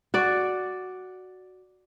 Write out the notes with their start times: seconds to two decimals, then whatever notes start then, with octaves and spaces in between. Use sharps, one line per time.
0.14 F#4 D5